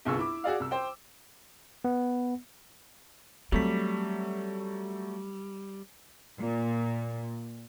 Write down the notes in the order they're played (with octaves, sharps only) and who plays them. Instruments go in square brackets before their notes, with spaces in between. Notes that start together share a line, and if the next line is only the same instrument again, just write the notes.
[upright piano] G1 C2 F4 G#4 C#6 E6
E4 D6
F#4 G#4 D5 F5
C2 E6
C5 G5
[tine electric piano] B3
[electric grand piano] F#3 A3 B6 [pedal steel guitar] G3 [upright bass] C4
[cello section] A#2